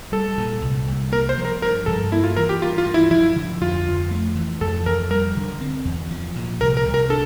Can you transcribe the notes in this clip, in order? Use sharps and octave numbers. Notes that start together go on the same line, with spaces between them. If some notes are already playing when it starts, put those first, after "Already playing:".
G3 A4
A#2
C2
C2
A#3 A#4
C5
F3
A#4
G2 A#4
G2 A4
A#3 E4
F4
E3 A#4
G4
G2 F4
F4
G2
E4
F3 E4
D3
F2 F4
F2
A3
E3
F2 A4
F2 A#4
G3 A#4
D3
C4
E2
F3
A#2
C2 A#4
A#4
C2
A#4
D4 A4